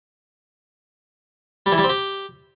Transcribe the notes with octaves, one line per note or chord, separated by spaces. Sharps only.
G3
E3
G3
C4
G4